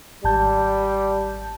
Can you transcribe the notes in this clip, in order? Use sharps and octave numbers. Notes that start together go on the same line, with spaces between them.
G#1 G3 A5 G6